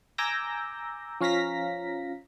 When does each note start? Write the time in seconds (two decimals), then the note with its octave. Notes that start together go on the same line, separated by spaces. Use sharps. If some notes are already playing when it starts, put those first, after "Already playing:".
0.18 G#5 A#5 D6 E6 G6 A#6
1.21 F3 C#4 F5 A#5 A#6 B6